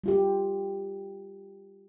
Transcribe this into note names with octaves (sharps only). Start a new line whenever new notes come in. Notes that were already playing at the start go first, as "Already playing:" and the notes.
G3 F4 G4